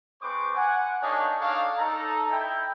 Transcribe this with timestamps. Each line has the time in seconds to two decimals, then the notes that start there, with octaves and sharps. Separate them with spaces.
0.22 G#3 C4 B4 C5 C#6 D6
0.55 F#5 G#5
1.01 A#3 D4 D#4 G#4 C#5
1.40 D4 D#4 G#4 A4 C#5 F5
1.78 D#4 A4 A#5
2.31 E4 G5